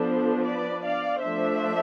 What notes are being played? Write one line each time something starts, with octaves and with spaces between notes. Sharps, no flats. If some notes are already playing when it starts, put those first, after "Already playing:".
Already playing: F3 B3 D4 A4 C5
B4 D5
D5 F5
F3 A3 D4 C5 E5